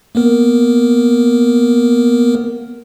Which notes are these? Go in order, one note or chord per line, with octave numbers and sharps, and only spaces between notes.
A#3 B3 A#4